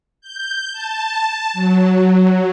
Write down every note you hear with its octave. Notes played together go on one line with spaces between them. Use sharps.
G6
A5
F#3